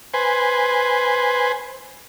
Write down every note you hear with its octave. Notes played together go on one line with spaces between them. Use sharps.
B4 C5 G#5